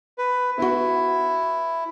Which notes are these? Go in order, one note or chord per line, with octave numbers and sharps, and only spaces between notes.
B4
B3 E4 F#4